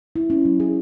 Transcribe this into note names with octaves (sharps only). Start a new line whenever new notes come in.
E4
C#4
F#3
G#4